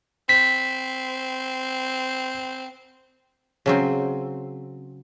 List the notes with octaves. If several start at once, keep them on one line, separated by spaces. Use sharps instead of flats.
C4 B6
C#3 F#3 C4